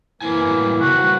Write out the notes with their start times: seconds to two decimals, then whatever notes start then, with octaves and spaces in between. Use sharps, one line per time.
0.22 F#2 E3 A#3 C4 E4 G#5
0.47 A2 F#3 G3
0.81 C#3 F#3 G3 F#4 B4